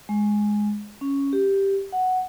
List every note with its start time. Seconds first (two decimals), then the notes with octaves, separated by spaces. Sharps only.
0.09 G#3
1.01 C#4
1.33 G4
1.92 F#5